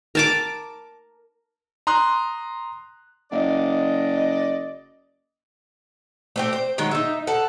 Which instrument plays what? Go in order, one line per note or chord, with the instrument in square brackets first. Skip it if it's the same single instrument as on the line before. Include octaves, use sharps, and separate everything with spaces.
[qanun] A#4 A5 D6
[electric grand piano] A#5 C6 D#6 F#6
[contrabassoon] F#1 [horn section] D5 D#5
[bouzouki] A3 C4 G4
C5
D#3 F#3 G#3
D#4 E5
A4 F#5